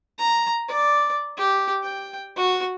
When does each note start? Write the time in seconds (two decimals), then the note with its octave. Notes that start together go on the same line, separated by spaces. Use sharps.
0.18 A#5
0.68 D5
1.37 G4
1.83 G5
2.36 F#4